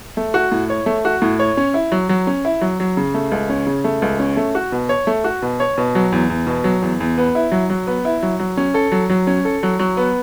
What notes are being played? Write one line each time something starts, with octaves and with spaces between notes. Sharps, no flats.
A3
F#4
A2
C#5
A3
F#4
A2
C#5
C#4
E4
F#3
F#3
C#4
E4
F#3
F#3
C#3
A3
C#2
C#4
C#3
A3
C#2
C#4
A3
F#4
B2
C#5
A3
F#4
B2
C#5
B2
F#3
E2
E2
B2
F#3
E2
E2
B3
E4
F#3
F#3
B3
E4
F#3
F#3
C#4
A4
F#3
F#3
C#4
A4
F#3
F#3
B3